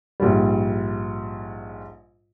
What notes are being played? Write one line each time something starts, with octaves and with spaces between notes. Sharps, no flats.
A#1 G#2 G3